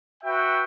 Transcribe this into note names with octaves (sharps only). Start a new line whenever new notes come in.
F#4 B4 E5 G5